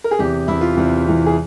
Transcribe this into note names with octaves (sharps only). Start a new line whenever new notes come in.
A#4
G#4
E2 C3 E3 G4
E2 C3 E3 E4
F4
E2 C3 E3
E2 C3 E3
G#4